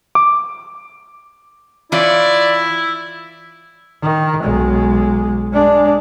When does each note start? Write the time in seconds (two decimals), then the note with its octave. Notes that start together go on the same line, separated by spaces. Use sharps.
0.15 D6
1.92 E3 E4 F4 C#5 D5
4.03 D#3
4.43 B1 G#3
5.53 G#3 D4